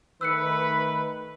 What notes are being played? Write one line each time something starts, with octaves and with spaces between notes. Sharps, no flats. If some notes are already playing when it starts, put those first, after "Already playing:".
D#3 A3 B4 E6 F#6 C#7